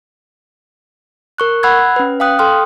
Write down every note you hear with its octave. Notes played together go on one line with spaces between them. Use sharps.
A#4 C#6 F#6
F#5 B5 E6 F#6 G#6
C#4 B4
F5 G5 D#6 F#6
A4 G5 C6 D#6 F6